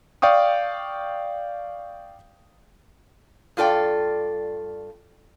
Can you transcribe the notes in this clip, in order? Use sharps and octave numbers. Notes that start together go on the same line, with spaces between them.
D5 F5 G5 C#6 D#6
G2 F4 A4 D5 G5